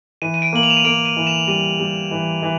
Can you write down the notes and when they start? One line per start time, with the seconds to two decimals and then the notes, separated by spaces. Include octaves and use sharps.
0.22 E3 D#7
0.34 D#7
0.42 D7
0.53 A#3 F#7
0.63 F7
0.70 E7
0.77 D#7
0.85 A#3 D7
1.05 D#7
1.17 E3
1.27 E7
1.48 G3 D#7
1.79 G3
2.11 E3
2.42 E3